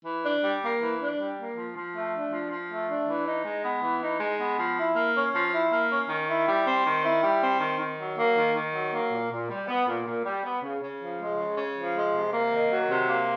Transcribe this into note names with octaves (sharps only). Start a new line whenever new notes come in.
E3
D4
G3
A#3
E3
D4
G3
A#3
F3
F3
A3
D4
F3
F3
A3
D4
E3
D#4
G#3
B3
E3
D#4
G#3
B3
F3
E4
A#3
C#4
F3
E4
A#3
C#4
D#3
E4
G3
C4
D#3
E4
G3
C4
D#3
D#3
F#3
A#3
D#3
D#3
F#3
A#3
A#2
A#2
G3
B3
A#2
A#2
G3
B3
C#3
C#3
F3
G#3
C#3
C#3
F3
G#3
C3
A#3
D#3
F#3
C3
A#3